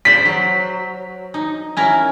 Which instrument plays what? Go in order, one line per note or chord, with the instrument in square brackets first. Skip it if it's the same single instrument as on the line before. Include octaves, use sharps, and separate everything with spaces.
[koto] C5 D5 [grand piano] B6
[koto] F#3
D#4
C#4 E4 A#4